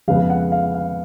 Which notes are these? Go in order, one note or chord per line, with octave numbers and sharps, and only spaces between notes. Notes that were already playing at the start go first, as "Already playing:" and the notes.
F2 C#3 G#3 B3 F5
F#5
F5
F5